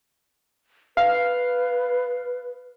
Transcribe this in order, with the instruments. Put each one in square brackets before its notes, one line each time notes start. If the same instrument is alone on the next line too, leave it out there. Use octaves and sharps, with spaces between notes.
[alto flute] B4 [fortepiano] F5